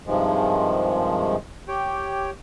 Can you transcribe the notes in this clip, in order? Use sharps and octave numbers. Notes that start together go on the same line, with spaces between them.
G2 C3 D#3 F3 G#3
G4 C#5 G5